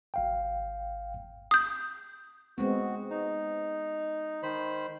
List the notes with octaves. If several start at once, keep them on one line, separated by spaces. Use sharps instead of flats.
G#1 F5 G5
D#6 G6
G#3 B3 C4 F#4
D#4
D#3 C5 B5